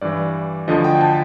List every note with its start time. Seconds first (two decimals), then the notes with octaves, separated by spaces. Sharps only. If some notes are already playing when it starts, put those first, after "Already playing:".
0.01 G2 E3 D5
0.68 D2 D3 F3 D#5
0.84 G5
1.01 A5